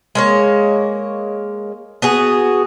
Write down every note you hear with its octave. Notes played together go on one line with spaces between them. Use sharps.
G#3 A#3 C#5
B3 F#4 G#4